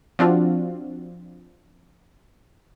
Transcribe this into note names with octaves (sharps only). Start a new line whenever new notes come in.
F3 C4 D4 F4 F#4